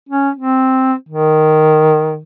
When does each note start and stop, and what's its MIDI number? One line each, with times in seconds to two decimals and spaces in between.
0.09 0.30 61
0.37 0.93 60
1.09 2.23 51